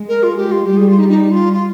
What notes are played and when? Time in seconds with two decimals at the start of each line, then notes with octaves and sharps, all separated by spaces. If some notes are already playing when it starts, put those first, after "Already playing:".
Already playing: G#3
0.09 A#4
0.23 F4
0.37 G4
0.52 F4
0.66 G3 G4
0.77 G#4
0.89 F4
0.99 D#4
1.09 D#4
1.32 F4
1.53 F4